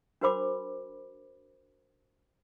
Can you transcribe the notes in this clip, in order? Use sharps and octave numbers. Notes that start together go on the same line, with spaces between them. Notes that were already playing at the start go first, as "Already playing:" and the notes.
D4 F#4 A#4 C5 B5 D6